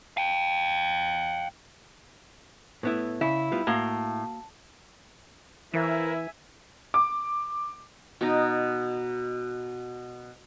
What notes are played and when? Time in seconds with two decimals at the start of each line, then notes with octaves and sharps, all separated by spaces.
0.17 F5 G5
2.83 A2 B3 E4
3.21 C#3 E4
3.52 G3 B3 F4
3.67 A2 A#3 F#4 F5
5.74 E3 E4 A#4 C5 E5 F5 G#5
6.94 D6
8.21 B2 D#4